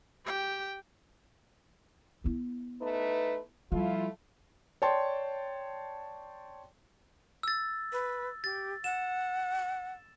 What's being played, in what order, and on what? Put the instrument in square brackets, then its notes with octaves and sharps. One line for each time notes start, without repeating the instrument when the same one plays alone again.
[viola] G4 G5
[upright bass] B3 E4
[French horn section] A3 D#4 B4
[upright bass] F3 G3 [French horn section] A3 E4 F4
[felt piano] C#5 D5 G5 A5 C6
[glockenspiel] E6 A6
[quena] B4
[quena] G4 [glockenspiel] A6
[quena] F#5 [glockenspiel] E7